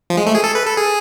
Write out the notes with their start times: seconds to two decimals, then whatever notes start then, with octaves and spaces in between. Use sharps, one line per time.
0.10 F3
0.17 G#3
0.27 A3
0.35 G#4
0.44 A4
0.55 B4
0.66 A4
0.77 G#4